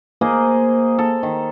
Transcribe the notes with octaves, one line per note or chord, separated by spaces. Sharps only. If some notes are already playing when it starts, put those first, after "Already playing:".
A#3 G#4 C5 D#5
A4
D#3